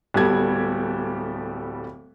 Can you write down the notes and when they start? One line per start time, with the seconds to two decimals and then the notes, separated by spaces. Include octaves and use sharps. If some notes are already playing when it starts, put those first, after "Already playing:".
0.14 D1 G3 B3 G4 A4 G#6